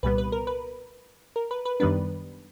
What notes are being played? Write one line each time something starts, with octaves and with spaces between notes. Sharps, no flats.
C2 A#2 G3 B3 B4
B4
A#4
B4
A#4
B4
B4
F#2 D#3 G3 B3 D4 B4